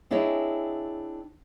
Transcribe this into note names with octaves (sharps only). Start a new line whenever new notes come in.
C4 D4 E4 G#4 C#5 D#5